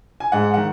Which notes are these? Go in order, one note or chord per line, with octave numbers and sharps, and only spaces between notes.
G#5
G#2 F#5
D#3 F#5